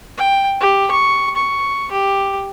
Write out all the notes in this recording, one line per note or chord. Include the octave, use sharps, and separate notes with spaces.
G5
G4
C#6
C#6
G4